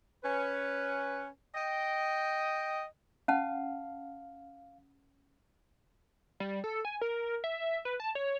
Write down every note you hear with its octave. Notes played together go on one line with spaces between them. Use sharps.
C#4 B4
D#5 G5
C#4 F5 F#5 A5
G3
A4
G#5
A#4
E5
B4
A5
C#5